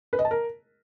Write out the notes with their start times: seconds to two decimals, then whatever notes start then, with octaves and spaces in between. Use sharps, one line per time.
0.13 B4
0.19 D#5
0.25 A5
0.31 A#4